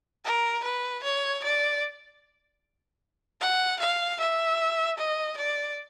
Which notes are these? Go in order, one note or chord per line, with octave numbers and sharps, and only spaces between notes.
A#4
B4
C#5
D5
F#5
F5
E5
D#5
D5